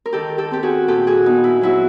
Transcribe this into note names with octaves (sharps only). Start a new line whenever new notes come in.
A#4
D#3 G4 A4
G4 A4
C4 G4
F#4 G#4
A#2 G4 A4
F#4 G#4
B3 D#4
E4
F#3 E4 F#4